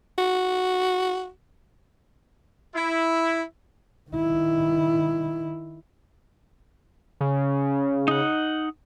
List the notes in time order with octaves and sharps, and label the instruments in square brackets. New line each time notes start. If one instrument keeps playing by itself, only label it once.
[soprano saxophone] F#4
[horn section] E4
[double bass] D#3 E4
[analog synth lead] C#3
[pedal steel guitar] D#4 F#5